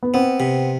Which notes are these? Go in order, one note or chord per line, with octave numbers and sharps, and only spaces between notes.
B3
B3 C4
C3